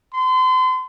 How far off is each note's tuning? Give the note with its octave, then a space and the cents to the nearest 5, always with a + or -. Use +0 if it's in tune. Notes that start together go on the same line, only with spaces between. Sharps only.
C6 -35